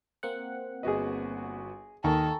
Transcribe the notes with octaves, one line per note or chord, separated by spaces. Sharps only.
A#3 C4 F#5
G1 F#4 G#4 B4 D#5
D#2 D#3 A#3 A4 G#5 A#5 C#6